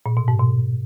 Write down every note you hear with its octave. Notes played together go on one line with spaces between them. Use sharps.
A#2
B2
G#2
B2